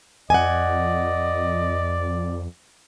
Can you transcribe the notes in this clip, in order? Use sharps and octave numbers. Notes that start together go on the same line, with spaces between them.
F2 D5 D#5 F#5 G#5